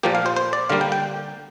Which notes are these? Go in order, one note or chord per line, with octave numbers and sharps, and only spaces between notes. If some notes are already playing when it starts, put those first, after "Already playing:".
A#2 F3 A#3 G4
F5
C5
C5
D5
D3 G3 A#3 F5
G5
G5